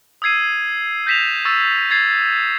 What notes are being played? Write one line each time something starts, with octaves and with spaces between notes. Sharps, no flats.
D#6 E6 G#6 C7 D#7
G6 A#6 B6 E7 F7
C#6 E6 A6
G#6 A6 C7